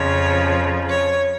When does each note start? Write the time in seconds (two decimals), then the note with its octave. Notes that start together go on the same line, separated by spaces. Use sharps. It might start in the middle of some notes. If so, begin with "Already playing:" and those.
Already playing: F2 C#3 F3 C#5
0.89 C#5